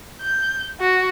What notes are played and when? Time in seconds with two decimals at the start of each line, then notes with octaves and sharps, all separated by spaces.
0.22 G6
0.80 F#4